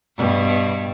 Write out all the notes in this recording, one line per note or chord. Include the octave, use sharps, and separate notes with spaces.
G2 B2